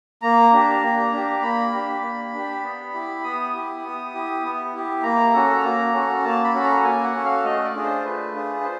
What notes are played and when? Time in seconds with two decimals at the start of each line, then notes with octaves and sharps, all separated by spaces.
0.22 A#3 A#5
0.53 D4 G4
0.83 A#3
1.13 D4 G4
1.42 A#3 B5
1.73 D4 G4
2.02 A#3
2.33 D4 G4
2.64 B3
2.94 E4 G4
3.24 B3 D#6
3.53 E4 G4
3.84 B3
4.14 E4 G4
4.44 B3
4.73 E4 G4
5.03 A#3 A#5
5.33 C#4 F#4 A4
5.63 A#3
5.94 C#4 F#4 A4
6.24 A#3 A5
6.44 B5
6.54 C#4 F#4 A4
6.64 A#5
6.83 A#3 G#5
7.04 F#5
7.14 C#4 F#4 A4
7.25 F5
7.44 A3 D#5
7.64 D5
7.75 D4 F4 G#4
7.84 C5
8.04 A3 B4
8.35 D4 F4 G#4
8.64 C5